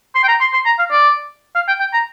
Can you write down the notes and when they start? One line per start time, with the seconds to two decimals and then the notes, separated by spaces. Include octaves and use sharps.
0.15 C6
0.23 G5
0.28 A#5
0.41 C6
0.53 C6
0.65 A#5
0.79 F5
0.91 D5
1.55 F5
1.68 G5
1.80 G5
1.93 A#5